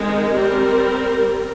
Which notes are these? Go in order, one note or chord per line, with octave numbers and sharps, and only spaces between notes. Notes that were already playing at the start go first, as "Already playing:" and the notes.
Already playing: D#3 G#3 C4
G3 C4 A#4